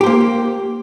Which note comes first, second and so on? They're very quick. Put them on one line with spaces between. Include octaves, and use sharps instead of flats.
G4 C5 A#3